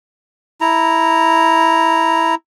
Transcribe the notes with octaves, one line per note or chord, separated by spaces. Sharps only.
E4 A#5